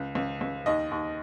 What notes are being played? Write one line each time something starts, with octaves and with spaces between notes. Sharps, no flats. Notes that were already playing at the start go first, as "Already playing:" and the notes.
Already playing: C#2
C#2
C#2
D#2 D#5
D#2